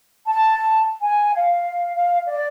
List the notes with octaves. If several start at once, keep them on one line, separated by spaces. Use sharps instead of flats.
A5
G#5
F5
F5
D5